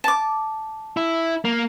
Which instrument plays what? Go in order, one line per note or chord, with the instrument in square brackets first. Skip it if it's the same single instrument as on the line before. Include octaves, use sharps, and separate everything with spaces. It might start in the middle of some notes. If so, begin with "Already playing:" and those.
[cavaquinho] A5 D6
[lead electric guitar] E4
A#3